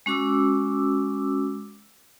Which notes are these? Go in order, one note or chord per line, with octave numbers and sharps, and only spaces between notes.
G#3 C#4 F#4 D6 E6